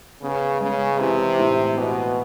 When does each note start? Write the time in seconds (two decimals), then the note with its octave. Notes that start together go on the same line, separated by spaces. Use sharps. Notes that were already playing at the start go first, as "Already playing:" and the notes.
0.22 C#3 B3
0.60 C#3 G#3
1.00 C3 E3
1.39 A2
1.77 B2 B3